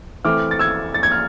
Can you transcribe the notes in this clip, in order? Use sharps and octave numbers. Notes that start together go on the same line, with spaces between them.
E3 A3 C4 D6 F6
A6
E6 G#6
A6
G#6
F6